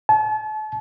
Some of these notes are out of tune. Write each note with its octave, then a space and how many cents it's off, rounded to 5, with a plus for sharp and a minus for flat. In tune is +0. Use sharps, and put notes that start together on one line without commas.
A5 -40